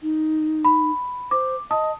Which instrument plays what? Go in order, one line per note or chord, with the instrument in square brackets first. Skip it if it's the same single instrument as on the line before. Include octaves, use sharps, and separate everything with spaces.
[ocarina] D#4
[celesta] B5
[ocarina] C5 [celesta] D6
[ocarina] D#5 [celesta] A5 D#6